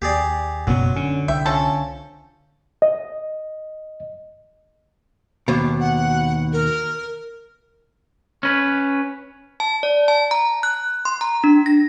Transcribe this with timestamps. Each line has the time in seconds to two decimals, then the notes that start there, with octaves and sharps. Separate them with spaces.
0.02 D#2 G4 G#4 D5
0.67 F#1 F#2 B2 F#3 B3
0.96 D3 C#4
1.28 C2 E5 G5
1.46 F3 C#4 A4
2.82 D#5
5.48 D#2 B2
5.80 F#5
6.53 A#4
8.43 C#4 B4
9.60 A5
9.83 D5
10.08 A5
10.31 A#5
10.63 F#6
11.05 C6
11.21 A#5
11.44 D4
11.66 A#6